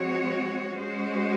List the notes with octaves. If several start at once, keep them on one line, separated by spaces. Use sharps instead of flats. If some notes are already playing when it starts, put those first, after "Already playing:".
Already playing: F3 G#3 C4 F#4 C#5
G#3 C#4 F#4 C5